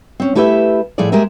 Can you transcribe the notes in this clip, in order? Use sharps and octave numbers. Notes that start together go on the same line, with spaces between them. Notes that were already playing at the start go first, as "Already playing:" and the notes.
C4 C#4
A3 E4 G4 B4 D#5 E5
A2 F3 A3 G#4 D5
G#3 A#3 G4 G#4 A#4 E5